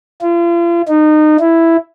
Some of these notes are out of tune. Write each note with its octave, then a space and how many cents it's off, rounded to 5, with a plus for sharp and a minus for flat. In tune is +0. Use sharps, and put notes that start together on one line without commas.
F4 -40
D#4 -25
E4 +5